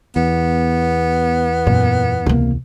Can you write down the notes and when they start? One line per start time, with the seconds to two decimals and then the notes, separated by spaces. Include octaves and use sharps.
0.16 E2 B3
1.67 F#2 A#2
2.26 C#2 C3 A#3